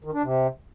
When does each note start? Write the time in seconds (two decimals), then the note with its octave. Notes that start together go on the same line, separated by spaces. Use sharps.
0.04 D#3
0.14 D4
0.23 C3